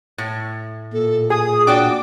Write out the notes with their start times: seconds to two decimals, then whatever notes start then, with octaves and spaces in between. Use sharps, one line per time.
0.18 A2
0.93 A#2 A4
1.30 G#4 D#6
1.67 D4 F#4 D5 G5 D6